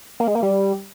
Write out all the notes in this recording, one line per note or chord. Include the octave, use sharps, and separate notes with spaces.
A#3
G#3
A#3
G3